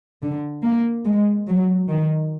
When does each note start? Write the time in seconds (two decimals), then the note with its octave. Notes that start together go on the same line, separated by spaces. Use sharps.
0.23 D3
0.64 A#3
1.06 G#3
1.48 F#3
1.89 D#3